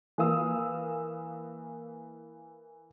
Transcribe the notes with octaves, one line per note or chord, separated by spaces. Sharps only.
E3 A#3 F5 D#6 E6